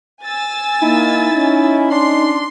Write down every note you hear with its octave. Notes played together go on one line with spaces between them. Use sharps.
G#5 E6 A6
A#3 D#4 E4
C#4
D4 C6